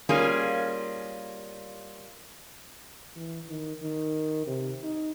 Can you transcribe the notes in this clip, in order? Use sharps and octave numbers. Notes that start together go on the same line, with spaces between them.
G3 A#3 C#4 F4 G#4
E3
D#3
D#3
C3
D#4